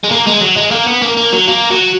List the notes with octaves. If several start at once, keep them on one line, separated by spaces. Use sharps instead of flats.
G#3
A#3
G#3
F#3
G#3
A#3
B3
A#3
A#3
F#3
A#3
F#3